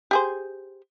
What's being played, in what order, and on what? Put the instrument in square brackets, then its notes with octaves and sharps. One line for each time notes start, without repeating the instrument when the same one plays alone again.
[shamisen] G4 G#4 C5